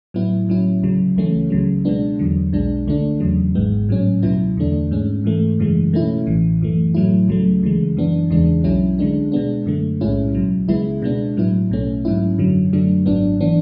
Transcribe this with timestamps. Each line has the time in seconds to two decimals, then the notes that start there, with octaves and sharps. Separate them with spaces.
0.14 A2 F#3 B3 E4
0.49 A2 F#3 C#4 E4
0.83 D2 C#3 F#3
1.17 C#2 C#3 E3 A3 C#4
1.50 C#2 C#3 F#3
1.85 B2 G#3 B3 D4
2.19 E2 D3 F#3
2.53 B1 B2 G#3 D4
2.87 D2 D3 A3 D4
3.20 E2 C#3 F#3
3.55 G#1 G#2 G#3 B3
3.89 A2 F#3 C#4
4.22 C#2 B2 F#3 B3 E4
4.57 E2 D3 A3 D4
4.91 G#2 G#3 C#4
5.24 G#2 E3 A3
5.59 F#2 C#3 E3 G#3
5.93 B2 A3 C#4 E4
6.26 A1 A2 E3
6.61 F#2 E3 A3
6.94 A2 F#3 A3 E4
7.28 C#2 C#3 F#3 A3
7.63 D2 C#3 E3 G#3
7.97 F#2 E3 B3 D4
8.30 E2 C#3 E3 G#3 D4
8.64 B1 B2 F#3 C#4 E4
8.99 D2 D3 G#3 D4
9.32 B2 G#3 B3 D4
9.66 F#2 D3 A3
10.01 B1 A2 G#3 C#4 E4
10.34 C#2 B2 F#3
10.68 C#2 C#3 G#3 B3 E4
11.02 B2 G#3 B3 D4
11.37 A2 F#3 B3 E4
11.70 B1 B2 A3 C#4
12.05 G#2 F#3 C#4 E4
12.38 F#2 D3 F#3
12.73 F#2 D3 F#3 A3 D4
13.06 G#1 G#2 F#3 B3 D4
13.40 E3 B3 D4